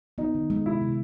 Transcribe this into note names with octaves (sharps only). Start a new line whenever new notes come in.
B3 D#4
D#3
G#3
C3 E4
C3